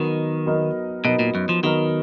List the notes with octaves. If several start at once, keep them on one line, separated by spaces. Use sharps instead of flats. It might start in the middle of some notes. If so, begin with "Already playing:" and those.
Already playing: D#3 F#3 B3 D#4 A#4 D#5
F#3 B3 D#4 A#4 D#5
B2 F#3 B3 D#4 A#4 D#5
A#2
F#2
F3
D#3 F#3 B3 D#4 A#4 D#5